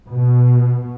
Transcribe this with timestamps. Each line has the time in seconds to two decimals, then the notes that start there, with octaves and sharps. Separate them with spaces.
0.12 B2